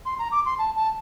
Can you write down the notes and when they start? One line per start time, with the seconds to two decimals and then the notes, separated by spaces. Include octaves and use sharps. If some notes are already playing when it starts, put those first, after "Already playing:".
0.06 C6
0.19 A#5
0.32 D6
0.45 C6
0.58 A5
0.76 A5